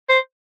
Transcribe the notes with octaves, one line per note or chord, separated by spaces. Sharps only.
C5